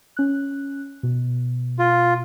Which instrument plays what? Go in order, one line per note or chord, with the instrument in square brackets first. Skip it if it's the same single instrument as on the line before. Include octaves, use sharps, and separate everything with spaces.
[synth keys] C#4 F#6
B2
[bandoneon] F4